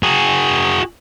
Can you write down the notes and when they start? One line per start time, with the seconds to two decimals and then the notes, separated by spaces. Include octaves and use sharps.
0.03 F#4 G#4